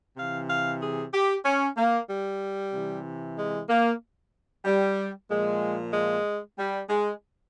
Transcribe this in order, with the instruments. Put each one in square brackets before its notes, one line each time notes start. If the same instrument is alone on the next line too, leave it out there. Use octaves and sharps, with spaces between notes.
[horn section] C3 E3 F5
F5
G#4
G4
C#4
A#3
G3
C3 E3
G#3
A#3
G3
A#2 F3 G#3
G#3
G3
G#3